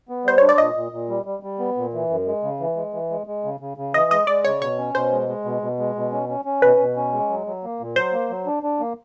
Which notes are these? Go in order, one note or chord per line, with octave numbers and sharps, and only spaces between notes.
B3
G3 C5
D4 C#5
D5
A#2 D#5
A#2
A#2
G3
G3
G3
B3
A#2
E3
F#2
G#3
C#3
E3
G#3
E3
G#3
G#3
C#3
C#3
C#3
E3 D#5
G#3 D#5
G#3 D5
C#3 C#5
B2 C#5
C#4
B2 C5
G#3
G#3
B2
B2
G#3
B2
C#4
C#4
C#4
B2 B4
B2
C#4
G#3
F#3
F#3
A#3
A#2
F#3 C5
A#3
F#3
D4
D4
A#3